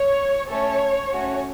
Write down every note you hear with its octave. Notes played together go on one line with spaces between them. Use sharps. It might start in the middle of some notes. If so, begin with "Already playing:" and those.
Already playing: C#5
A3 C#4 A4 C#5
A3 C#4 F#4